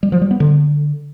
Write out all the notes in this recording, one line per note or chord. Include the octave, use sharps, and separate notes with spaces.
G3
F3
G3
B3
D3